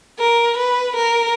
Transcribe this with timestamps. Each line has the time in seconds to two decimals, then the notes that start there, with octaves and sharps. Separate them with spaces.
0.19 A#4
0.58 B4
0.96 A#4